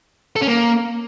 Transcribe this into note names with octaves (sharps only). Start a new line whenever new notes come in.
A4
C#4
A#3